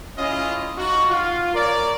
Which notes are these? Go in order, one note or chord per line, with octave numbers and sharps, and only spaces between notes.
C#4 E4 F4 G#4 D#5
D#4 F4 F#4
F4
A#4 C#5 D5